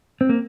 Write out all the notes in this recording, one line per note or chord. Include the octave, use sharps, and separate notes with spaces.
C4
A#3